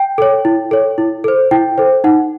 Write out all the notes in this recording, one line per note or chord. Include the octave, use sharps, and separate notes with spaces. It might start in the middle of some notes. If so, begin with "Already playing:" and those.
Already playing: G5
A4 C#5
E4
A4 C#5
E4
A4 C5
E4 G5
A4 C5
D#4 F#5